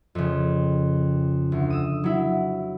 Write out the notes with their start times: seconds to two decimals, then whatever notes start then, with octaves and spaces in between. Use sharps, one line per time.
0.15 F2 C#3
1.52 D2
1.70 D#6 E6
2.04 F#3 E4